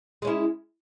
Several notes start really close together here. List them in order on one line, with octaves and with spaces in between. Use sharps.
G#3 C#4 E4